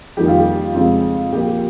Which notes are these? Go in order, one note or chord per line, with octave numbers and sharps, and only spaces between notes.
F2 D#3 G3 A#3 G4
F4
G4
F2 C#3 G#3 C4 F4
A#2 F3 A#3 G4
G4